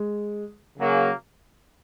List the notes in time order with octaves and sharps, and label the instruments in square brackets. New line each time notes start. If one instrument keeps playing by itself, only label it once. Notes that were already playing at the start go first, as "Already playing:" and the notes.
Already playing: [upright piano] G#3
[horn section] C#3 F#3 A#3